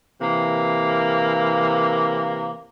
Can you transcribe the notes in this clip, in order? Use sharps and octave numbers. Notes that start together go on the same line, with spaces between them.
C3 E3 A#3